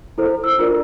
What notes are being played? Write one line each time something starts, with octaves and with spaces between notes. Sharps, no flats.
E4 A4 C5
E6
D4 F4 A#4 D5